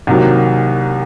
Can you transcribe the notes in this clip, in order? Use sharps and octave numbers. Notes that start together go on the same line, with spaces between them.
C2 C3 D#3 F#3 A#3